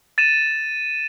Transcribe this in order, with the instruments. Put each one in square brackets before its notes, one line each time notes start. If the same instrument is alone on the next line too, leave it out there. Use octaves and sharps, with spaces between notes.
[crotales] A6 D#7 E7